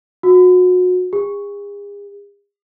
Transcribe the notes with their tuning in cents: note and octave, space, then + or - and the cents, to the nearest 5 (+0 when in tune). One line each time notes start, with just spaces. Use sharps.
F#4 -30
G#4 -40